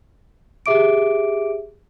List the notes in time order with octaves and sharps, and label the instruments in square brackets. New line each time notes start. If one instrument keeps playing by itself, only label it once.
[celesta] G4 G#4 E5 D6 D7